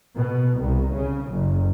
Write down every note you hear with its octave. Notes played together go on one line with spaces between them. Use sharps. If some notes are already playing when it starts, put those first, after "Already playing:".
B2
C2
C#3
F#1